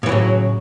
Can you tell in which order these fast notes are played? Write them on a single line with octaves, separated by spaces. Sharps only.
A2 E3 F#3 C#3